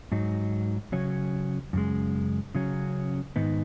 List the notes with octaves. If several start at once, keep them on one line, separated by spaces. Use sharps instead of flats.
G#2 F#3 D#4
C#3 F#3 C#4
F#2 C#3 G#3
C#3 F#3 C#4
G#2 D#3 B3 D#4